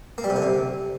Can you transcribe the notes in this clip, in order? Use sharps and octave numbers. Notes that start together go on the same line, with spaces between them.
A#3
G3
C3
D3
C3